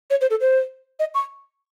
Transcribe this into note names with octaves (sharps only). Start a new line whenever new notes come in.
C#5
C5
A4
C5
D#5
C#6